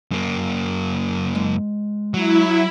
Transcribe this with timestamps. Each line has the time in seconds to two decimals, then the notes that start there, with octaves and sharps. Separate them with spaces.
0.11 F#2 A#3
1.35 G#3
2.14 F#3 E4